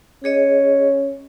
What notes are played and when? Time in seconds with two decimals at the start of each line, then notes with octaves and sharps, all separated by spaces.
0.24 C#4 G#4 C#5 D#5